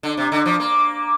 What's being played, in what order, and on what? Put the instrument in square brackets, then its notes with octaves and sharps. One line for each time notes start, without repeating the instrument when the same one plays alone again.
[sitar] D3
C3
D3
F3
A#3